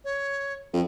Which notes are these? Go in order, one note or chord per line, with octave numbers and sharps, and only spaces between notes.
C#5
F2